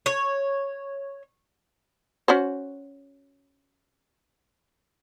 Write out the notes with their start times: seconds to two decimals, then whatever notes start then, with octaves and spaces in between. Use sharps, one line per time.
0.06 C#5
2.28 C#4 F#4 C5